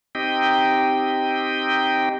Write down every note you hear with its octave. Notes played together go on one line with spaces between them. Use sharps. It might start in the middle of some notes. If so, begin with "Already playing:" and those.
C4 D#4 G4 D#5 G5